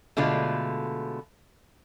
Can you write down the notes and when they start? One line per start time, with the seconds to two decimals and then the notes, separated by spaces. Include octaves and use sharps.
0.17 B2 D3 G#3 A3 F4